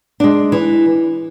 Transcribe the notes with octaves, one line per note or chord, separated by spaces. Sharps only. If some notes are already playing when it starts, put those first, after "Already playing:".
G#3 D4
E3